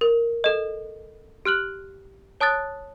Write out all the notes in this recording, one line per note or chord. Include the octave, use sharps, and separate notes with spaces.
A#4
A4 D#5
G4 F6 F#6 F#7
C#5 A5 D#6 F#6 A6